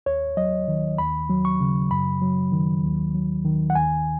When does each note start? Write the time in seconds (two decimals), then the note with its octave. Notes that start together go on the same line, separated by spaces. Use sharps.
0.06 D#2 C#5
0.37 F#3 D#5
0.68 D#3
0.98 D#2 B5
1.30 F#3
1.45 C#6
1.60 C#3
1.91 F#2 B5
2.22 F#3
2.52 D#3
2.83 D#2
3.14 F#3
3.45 D#3
3.70 F#5
3.75 D#2 G#5